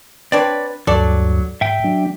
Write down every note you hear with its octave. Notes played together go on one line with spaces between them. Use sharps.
C4 D4 B4 C#5 D5
D2 G2 F#3 A4 D5
G#2 E5 G5
F#3 D4